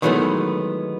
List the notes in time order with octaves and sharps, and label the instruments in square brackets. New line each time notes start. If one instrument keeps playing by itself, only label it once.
[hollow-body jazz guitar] D#3 E3 F#3 G#3 A3 B3